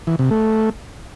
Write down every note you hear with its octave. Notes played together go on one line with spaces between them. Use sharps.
E3
C3
A3